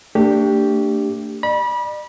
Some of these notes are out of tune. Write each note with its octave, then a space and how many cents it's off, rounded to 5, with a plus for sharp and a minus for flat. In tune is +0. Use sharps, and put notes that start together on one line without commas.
A3 +35 D4 +0 G4 +0
D5 +40 B5 -30